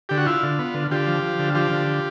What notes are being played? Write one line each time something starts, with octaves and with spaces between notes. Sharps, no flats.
D3 G4
F#4
E4 F4
D3
B3
D3
D3 F4 G4
F3
F3
D3
F3 F4 G4
D3